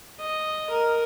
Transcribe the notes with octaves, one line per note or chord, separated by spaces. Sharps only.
D#5
A#4